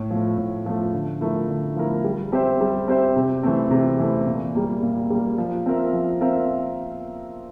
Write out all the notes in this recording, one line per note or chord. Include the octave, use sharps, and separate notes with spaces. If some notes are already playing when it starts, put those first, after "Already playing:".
Already playing: A2
F3 A3
A2
F3 A3
D3
F3 A3 E4 A#4
D3
F3 A3 E4 A#4
G3
C4 G4 C5 E5
G3
C4 G4 C5 E5
C3
E3 A3 C4
C3
E3 A3 C4
A#2
G3 A#3
A#2
G3 A#3
F3
C4 F4 A#4 E5
F3
C4 F4 A#4 E5